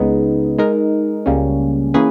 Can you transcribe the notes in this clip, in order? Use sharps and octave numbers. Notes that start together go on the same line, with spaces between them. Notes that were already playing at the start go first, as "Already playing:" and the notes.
Already playing: C#2 C#3 G#3 B3 D#4
G#3 D#4 A#4
C#2 C#3 G3 A#3 C#4
E3 A#3 C#4 G#4 B4